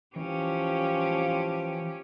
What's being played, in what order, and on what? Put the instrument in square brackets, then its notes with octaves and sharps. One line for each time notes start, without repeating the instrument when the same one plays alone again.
[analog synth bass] E3 [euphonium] F3 [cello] C#4 G4